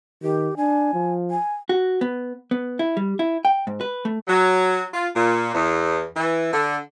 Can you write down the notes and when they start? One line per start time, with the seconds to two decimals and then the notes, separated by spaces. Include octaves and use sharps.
0.23 D#3 G4
0.57 D4 G#5
0.93 F3
1.31 G#5
1.69 F#4
2.01 B3
2.51 B3
2.79 E4
2.97 G3
3.19 E4
3.45 G5
3.67 G#2
3.81 B4
4.05 A3
4.27 F#3
4.93 F4
5.15 A#2
5.53 E2
6.16 E3
6.53 D3